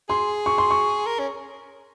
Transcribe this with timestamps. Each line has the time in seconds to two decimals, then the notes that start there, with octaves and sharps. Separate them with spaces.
0.09 G#4 C6
0.46 C#6
0.58 C6
0.71 C#6
1.06 A#4
1.19 C#4